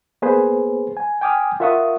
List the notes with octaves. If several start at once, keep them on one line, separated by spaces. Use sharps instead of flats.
A#3 B3 G#4 B4 C5
G#5
G5 G#5 D6 D#6 F6
F4 A#4 E5 F#5 C#6 D#6